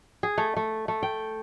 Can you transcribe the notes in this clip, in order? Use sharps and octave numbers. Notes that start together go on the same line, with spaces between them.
G#4
A3
A3
A3
G5